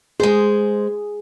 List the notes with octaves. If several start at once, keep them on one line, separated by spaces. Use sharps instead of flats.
G#3 G#4 C5